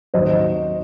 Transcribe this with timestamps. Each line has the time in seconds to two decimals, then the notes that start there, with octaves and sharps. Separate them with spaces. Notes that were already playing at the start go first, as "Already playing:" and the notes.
0.14 D#2 D#3 F#3 C5 D#5